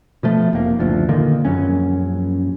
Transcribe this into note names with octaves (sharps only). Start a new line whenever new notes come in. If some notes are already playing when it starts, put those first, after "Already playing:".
B2 F3 A3
F1 A#3
F#1 D2 F3
A#2 D3 D#3 A#3
A#1 F#2 F#3 C#4